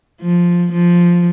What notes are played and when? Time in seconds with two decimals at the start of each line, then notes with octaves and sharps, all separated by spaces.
0.21 F3
0.72 F3